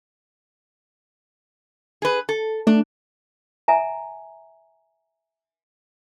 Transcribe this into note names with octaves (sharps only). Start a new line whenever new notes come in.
G#4 B4
A4
A3 D4
E5 G#5 A#5